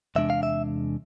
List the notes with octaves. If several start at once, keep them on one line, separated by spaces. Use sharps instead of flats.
E2 C3 G#3 D4 E5
F5
E5